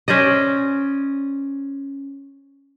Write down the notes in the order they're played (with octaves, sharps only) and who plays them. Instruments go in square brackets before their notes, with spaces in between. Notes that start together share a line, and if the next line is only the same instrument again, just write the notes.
[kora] C#4 C5 D5 D#5